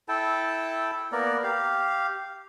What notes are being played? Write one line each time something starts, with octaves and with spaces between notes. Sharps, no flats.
E4 A4 G5 A5
A#3 B3 A#4 D5
G4 F5